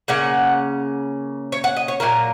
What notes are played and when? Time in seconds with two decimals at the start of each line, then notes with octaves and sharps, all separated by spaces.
0.08 C#3 A#3 C#4 F#5
1.52 C#5
1.64 F#5
1.76 D#5
1.88 C#5
2.00 A#2 F#3 A#3 A#4